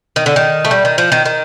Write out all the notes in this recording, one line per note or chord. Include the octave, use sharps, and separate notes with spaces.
D#3
D3
D#3
A3
G3
D#3
F3
D#3
D#3